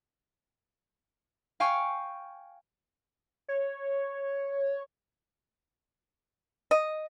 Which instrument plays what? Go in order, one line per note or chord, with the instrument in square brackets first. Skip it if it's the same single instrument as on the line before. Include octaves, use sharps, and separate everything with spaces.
[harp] F5 G5 G#5 C#6
[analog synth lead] C#5
[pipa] D#5